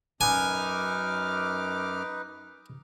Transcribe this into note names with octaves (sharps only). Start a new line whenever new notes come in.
F#2 D#4 B4 G#5 D6 F6